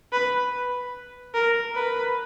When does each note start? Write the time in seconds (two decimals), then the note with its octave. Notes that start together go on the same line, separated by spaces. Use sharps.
0.12 B4
1.34 A#4
1.75 B4